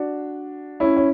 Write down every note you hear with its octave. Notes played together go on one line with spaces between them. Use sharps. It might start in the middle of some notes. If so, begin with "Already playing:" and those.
Already playing: D4 F#4
C#4 E4
C#4